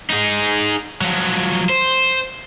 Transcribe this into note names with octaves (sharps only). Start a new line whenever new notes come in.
D#4 G#4
F3 F#3
C5